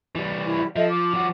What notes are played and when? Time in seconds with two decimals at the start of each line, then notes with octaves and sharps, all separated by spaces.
0.16 E3 G3
0.46 E4
0.76 F3 A4 D#5 E5
0.90 D6
1.14 F3 F#4